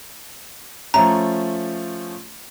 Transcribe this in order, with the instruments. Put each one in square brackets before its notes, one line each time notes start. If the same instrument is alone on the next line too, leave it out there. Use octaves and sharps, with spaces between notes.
[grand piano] F3 A3 C#4 [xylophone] A#5